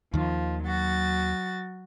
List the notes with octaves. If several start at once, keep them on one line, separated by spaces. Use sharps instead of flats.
D#2 D#3 F3
F#3 F#4 A6